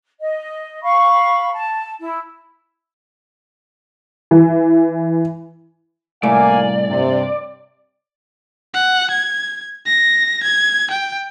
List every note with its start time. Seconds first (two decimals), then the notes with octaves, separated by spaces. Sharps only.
0.19 D#5
0.83 F5 B5 C#6
1.53 A5
2.00 E4
4.31 E3
6.23 C2 A2 A3 A#3 D5 F5 G#5
6.88 G2 C3
8.74 F#5
9.11 G#6
9.86 A#6
10.44 G#6
10.91 G5